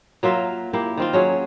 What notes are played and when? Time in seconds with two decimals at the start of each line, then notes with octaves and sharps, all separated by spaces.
0.23 F#3 A#3 F4 E5
0.73 A#3 E4 G4
0.97 D#3 C4 F4
1.13 F#3 C#4 G#4